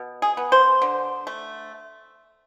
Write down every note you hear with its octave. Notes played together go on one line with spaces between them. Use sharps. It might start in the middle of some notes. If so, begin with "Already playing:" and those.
Already playing: B2
G#4
B3
C5
D3
A3